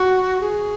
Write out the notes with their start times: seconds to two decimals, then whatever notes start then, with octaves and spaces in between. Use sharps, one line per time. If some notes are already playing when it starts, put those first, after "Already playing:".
Already playing: F#4
0.40 G#4